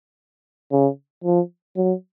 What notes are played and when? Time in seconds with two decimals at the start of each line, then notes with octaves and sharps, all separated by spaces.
0.72 C#3
1.24 F3
1.77 F#3